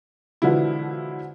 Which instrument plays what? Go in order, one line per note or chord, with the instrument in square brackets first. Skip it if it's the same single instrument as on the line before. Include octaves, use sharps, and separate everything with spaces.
[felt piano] B2 D3 E3 F3 G#3 E4